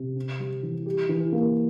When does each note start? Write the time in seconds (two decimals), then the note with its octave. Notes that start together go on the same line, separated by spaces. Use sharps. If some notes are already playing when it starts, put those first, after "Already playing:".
Already playing: C3
0.16 C4
0.40 G3
0.63 E3
0.86 G4
1.09 E3
1.32 A#3